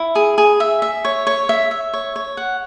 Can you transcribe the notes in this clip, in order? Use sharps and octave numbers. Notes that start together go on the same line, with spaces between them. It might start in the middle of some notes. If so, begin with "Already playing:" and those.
Already playing: E4
G#4
G#4
E5
E5
C#5
C#5
E5
E5
C#5
C#5
F#5